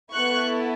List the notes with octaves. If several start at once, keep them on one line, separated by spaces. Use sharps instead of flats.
B3 E4 A4 C#6 F#6